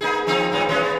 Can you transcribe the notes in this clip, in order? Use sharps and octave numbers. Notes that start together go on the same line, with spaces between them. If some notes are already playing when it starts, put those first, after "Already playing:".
A#3 D#4 G#4
F3 C4 D#4
A2 F#3 D#4
E3 G#3 C#4
B3